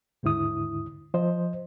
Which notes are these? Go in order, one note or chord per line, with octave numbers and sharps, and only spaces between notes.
D#2 G#2 D3 E4 D#6
F3 C5 D#5